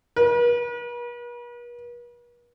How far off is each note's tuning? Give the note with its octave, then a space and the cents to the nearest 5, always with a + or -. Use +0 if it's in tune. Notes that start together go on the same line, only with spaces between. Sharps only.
B4 -45